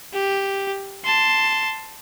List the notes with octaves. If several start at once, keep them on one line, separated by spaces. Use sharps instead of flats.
G4
A5 C6